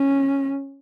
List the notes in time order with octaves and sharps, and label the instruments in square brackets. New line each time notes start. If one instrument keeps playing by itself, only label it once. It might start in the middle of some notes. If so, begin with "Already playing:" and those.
Already playing: [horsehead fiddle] C#4